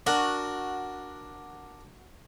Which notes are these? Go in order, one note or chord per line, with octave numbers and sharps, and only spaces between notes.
D4 F#4 A#4